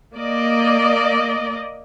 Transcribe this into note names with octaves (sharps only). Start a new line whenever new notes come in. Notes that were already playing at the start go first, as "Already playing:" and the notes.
A#3 D5 D#5